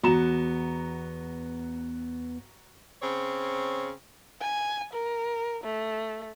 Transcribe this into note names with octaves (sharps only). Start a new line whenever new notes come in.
E2 B3 F#4 A#5 E7
C#3 C4 C#5
G#5
A#4
A3